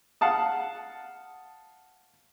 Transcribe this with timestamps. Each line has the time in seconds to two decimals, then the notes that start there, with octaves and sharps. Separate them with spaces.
0.21 F5 F#5 A5 D#6